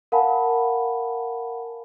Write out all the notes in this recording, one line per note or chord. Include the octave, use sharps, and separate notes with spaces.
A#4 F5 F#5 G#5 A5 B5